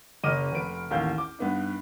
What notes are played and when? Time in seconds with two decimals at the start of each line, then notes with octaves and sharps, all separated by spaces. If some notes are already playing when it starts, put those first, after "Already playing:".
0.23 F#1 C#4 D#5 D6 F6 D#7
0.52 F1 B4 D7
0.91 A1 D#2 F5 G6
1.18 D6
1.39 G2 B3 D#4